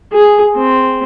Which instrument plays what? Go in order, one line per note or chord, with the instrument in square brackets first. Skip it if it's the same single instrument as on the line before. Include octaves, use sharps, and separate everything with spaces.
[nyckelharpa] G#4
C4